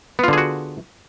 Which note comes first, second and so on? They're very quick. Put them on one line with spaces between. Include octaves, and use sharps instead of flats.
B3 F4 D3 G#4 F#4